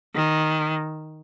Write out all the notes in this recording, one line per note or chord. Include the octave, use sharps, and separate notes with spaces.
D#3